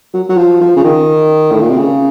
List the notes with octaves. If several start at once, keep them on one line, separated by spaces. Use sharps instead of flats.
F#3
F#3
F3
F3
C#3
D#3
A2
A#2
C3
C#3